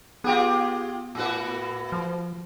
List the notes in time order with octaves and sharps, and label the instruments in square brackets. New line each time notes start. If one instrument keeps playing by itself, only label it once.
[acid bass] B3 [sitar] F4 G4 G#4
[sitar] A2 F#4 B4
[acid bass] F3